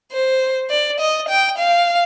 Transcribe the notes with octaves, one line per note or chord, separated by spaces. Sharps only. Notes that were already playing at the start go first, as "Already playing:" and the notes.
C5
D5
D#5
G5
F5